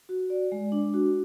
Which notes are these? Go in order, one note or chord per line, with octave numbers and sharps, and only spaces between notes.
F#4
D5
G#3
D4
F#4